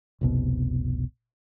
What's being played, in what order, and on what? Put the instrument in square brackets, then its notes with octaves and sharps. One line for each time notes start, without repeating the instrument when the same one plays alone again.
[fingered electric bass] F1 C2 B2